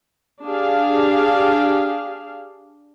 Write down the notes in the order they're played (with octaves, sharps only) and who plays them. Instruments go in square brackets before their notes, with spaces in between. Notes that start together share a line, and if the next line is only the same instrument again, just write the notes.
[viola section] D4 G4 G#4 F5